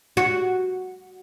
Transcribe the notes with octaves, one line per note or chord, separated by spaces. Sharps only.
F#4